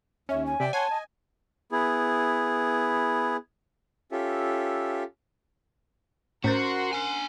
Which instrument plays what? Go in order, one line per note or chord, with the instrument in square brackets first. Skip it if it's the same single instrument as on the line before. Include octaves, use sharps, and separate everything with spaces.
[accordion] D#2 [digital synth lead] C#4 [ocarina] E5
[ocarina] G#5
[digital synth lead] C3 [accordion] D5 E5 G5
[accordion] C#5 F#5 C6 [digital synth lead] G#5 [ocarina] A5
[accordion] D#5
[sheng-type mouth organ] B3 E4 G#4
C#4 F4 G4 A4 E5
[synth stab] A2 G6 [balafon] C#4 C5 [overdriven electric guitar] F#4 [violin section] A#4 F#5 C6
[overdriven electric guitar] D4 G#5